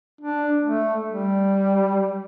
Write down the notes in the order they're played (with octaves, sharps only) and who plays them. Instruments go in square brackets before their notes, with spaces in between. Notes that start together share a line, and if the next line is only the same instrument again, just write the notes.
[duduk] D4
A3
G3